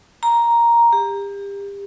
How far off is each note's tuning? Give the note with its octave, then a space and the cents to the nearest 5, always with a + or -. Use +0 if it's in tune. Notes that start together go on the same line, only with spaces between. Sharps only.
A#5 +5
G4 +30